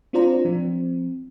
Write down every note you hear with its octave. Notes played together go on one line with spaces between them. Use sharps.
C4 D4 F4 C5 D5 A#5
F3 C4